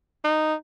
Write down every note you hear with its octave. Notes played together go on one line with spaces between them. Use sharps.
D#4